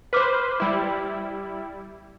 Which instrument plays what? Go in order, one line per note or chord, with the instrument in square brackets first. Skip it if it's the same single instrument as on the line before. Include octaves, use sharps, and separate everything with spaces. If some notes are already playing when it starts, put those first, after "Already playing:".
[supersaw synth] B4 C5 [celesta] D6 F6 B6
[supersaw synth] G3 E4